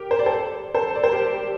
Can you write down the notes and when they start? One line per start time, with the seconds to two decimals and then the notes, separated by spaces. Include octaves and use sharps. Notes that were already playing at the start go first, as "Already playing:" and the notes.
Already playing: G4 A#4
0.11 C5
0.19 D5
0.26 A4 C5
0.74 A4 C5
0.95 D5
1.04 C5
1.12 G4 A#4